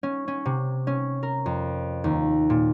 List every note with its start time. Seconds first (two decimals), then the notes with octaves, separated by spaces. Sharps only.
0.03 C#4
0.28 C#4
0.46 C3
0.87 C#4
1.23 A#4
1.46 F2
2.04 D#2
2.50 A#2